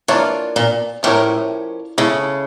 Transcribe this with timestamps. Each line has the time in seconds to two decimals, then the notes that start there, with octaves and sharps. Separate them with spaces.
0.08 E3 A#3 D4 F4 C#5
0.56 A#2
1.03 A2 F3 C#4 G4 A#4 C#5
1.98 C#3 A3 E4 A4